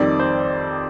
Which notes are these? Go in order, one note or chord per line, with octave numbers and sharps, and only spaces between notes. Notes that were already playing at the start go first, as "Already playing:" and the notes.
Already playing: F2 D#3 G3 C4 D#4 D5
C5